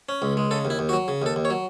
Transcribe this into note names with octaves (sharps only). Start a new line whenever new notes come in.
C#4
C#2
G#3
C#3 A4
D#2
E4
D#2
F#4
F#3
C#3
D#2 A4
D#2
C#5
F#3